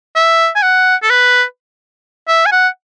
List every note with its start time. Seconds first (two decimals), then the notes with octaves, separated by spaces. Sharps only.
0.16 E5
0.56 G#5
0.62 F#5
1.02 A4
1.10 B4
2.28 E5
2.46 G#5
2.52 F#5